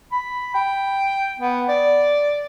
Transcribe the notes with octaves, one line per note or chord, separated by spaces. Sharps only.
B5
G5
B3
D5